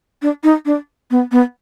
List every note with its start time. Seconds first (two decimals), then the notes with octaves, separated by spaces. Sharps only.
0.22 D4
0.43 D#4
0.66 D4
1.11 B3
1.32 B3